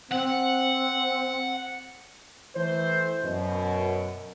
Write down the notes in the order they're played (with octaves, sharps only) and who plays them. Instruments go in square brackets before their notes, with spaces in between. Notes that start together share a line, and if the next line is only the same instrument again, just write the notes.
[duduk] C4 [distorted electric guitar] F#5
[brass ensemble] E3 A3 C5
F#2 B2